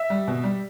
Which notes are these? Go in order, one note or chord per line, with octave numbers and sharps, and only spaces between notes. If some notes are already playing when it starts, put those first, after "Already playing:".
Already playing: E5
G3
B2
G3